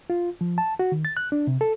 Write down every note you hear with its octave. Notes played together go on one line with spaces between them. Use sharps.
F4
F3
A5
F#4
D#3
A6
F#6
D4
C3
A4